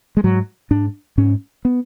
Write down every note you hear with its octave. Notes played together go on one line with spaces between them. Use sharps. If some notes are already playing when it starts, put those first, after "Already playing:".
G#3
G#2 F#3
G#2 D4
G#2 C#4
B3